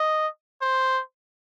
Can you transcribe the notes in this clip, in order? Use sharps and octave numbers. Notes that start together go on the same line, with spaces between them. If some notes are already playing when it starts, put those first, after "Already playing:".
Already playing: D#5
C5